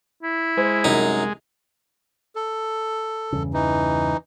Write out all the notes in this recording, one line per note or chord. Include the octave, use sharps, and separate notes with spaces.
E4
G#3 C5
C2 F#2 D#4
A4
E2 G2 C#3
E3 D#4